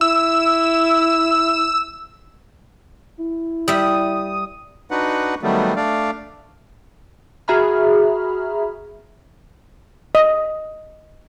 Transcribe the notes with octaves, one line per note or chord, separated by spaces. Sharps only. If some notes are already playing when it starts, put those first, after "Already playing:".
E4 E6
E4
G3 E5 D#6
D4 D#4 F#4 B4 F#5
D#3 F#3 G3 A3 B3
A3 D4 D5 F5
F#4 G#4 E5 A#5 B5 F6
D#5